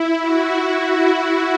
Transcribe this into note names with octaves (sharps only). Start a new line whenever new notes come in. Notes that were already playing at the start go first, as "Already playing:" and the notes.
Already playing: E4
F#4